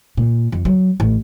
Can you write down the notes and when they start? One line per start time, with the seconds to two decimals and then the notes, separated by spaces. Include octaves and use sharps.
0.17 A#2
0.52 F2
0.65 F#3
1.00 A1